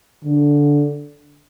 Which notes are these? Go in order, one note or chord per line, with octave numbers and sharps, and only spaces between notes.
D3